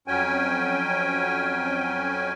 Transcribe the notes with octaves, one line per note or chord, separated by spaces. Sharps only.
F2 F#3 C#4 G5 G#5